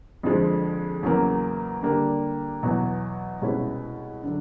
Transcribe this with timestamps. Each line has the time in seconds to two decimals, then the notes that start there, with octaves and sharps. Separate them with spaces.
0.23 F2 D3 F3 G#3
1.03 E2 C#3 F#3 A#3
1.83 D3 G3 A#3
2.63 E2 B2 F#3
3.42 C2 B2 G#3 C#4 E4
4.23 D3 F#3